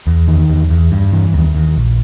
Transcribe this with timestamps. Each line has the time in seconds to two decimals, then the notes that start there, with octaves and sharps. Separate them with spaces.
0.07 E2
0.28 D#3
0.50 E2
0.70 E2
0.92 G2
1.13 E3
1.34 D#2
1.55 D#2
1.76 A#1